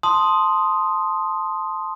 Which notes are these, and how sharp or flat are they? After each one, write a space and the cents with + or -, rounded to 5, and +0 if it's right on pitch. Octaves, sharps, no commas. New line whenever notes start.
A5 +0 C6 +0 D#6 +0